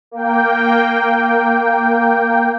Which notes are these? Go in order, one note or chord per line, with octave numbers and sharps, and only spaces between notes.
A#3 G5